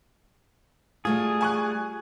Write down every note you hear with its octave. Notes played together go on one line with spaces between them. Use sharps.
G3 A3 F4 G#4
G#5 C#6 F#6